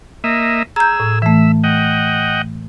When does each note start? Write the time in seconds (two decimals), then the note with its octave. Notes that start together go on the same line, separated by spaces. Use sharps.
0.24 A#3 D#5 E5
0.76 G#4 A#5 E6 G6
1.00 A2
1.22 E3 A3 E5
1.64 D#5 F#5 G5